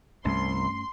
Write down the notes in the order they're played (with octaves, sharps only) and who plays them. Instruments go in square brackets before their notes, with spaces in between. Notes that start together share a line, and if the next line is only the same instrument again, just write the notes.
[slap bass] C2 [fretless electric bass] G2 A3 C#4 [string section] C6